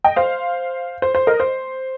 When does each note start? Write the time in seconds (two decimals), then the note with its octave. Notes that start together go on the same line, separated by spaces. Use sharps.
0.04 D#5 G5
0.16 C5 F5
1.02 C5
1.15 C5
1.27 A#4 D#5
1.40 C5